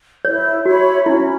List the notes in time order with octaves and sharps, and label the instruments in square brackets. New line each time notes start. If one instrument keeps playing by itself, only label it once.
[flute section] E4 [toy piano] C#5
[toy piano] F#4 [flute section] C#5 E5 B5
[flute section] C#4 [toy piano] E4